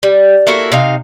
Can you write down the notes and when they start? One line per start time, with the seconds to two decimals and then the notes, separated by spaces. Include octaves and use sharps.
0.03 G3
0.47 A#3 E4 F#4 A4
0.72 C3 D#4 F5